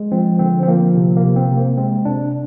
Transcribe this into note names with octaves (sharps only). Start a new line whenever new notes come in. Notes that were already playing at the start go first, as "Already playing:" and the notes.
Already playing: G#3
F3 C4
D3 C4
C4
F3 A#3
C3
A#3
C3
C4
C3
A#3
G#3 C4
C3 D4